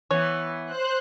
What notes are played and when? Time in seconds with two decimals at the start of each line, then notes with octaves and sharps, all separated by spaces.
0.11 E3 B3 C#5
0.67 C5 F#6